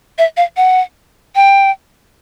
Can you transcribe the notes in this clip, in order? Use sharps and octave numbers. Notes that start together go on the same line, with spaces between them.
E5
F5
F#5
G5